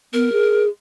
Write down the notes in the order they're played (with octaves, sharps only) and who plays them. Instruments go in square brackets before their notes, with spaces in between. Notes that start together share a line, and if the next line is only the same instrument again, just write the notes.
[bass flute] B3 [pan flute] A#4
[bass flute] G#4